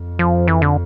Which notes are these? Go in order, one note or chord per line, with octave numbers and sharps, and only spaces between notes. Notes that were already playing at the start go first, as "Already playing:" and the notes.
Already playing: F2
F3
E3
D3